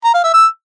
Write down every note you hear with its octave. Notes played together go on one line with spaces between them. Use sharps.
A#5
F5
E5
E6